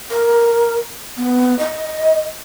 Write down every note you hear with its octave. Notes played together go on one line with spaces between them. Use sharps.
A#4
B3
D#5